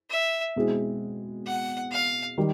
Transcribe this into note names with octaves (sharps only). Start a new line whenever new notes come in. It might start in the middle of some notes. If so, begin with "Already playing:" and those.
E5
B2 G#3 C4 E4 G#4
F#5
F5
D#3 G3